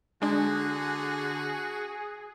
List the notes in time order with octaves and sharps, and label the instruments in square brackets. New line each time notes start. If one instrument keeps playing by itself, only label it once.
[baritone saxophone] D3 [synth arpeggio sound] G#3 D4 [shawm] F#4 [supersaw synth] G#4